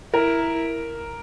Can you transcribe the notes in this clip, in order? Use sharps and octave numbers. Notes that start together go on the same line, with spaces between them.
E4 A#4